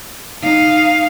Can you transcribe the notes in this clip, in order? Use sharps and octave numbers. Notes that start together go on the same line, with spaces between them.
D#4 F5